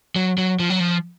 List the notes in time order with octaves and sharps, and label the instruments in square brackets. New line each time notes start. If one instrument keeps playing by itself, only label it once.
[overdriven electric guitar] F#3
F#3
F3
F#3
F3